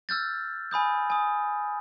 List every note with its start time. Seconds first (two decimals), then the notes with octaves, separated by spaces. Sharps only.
0.09 E6 F6 G6 A6
0.71 G#5 B5 D#6 G6
1.10 G#5 D#6